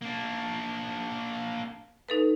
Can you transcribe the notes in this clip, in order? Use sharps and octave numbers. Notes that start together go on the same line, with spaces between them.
A#3 D4
D#4 A4 B4